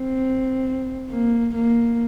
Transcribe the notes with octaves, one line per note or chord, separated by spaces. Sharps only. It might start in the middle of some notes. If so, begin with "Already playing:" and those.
Already playing: C4
A#3
A#3